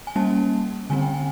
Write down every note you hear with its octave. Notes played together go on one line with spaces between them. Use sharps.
G#5
G3 A#3 C#4 A5
D3 G3 C4 G#5
G5
G#5